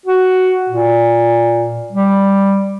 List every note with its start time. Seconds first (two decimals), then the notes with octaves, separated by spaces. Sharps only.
0.06 F#4
0.69 A#2
1.92 G3